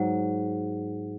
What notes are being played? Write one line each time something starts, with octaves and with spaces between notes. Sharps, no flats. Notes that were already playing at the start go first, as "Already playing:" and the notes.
Already playing: G#2 F#3